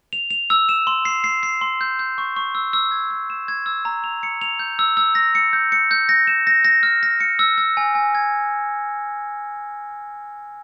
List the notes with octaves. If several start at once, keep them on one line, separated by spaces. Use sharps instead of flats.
F7
F7
E6
E7
C6
C7
C7
C7
C6
G6
G6
C#6
C#6
E6
E6
G#6
E6
E7
G#6
E6
A#5
F7
C#7
F7
G6
E6
E6
A#6
C#7
G6
C#7
G6
A#6
E7
A#6
A#6
F6
A#6
C#7
E6
E6
G#5
G#5
G#6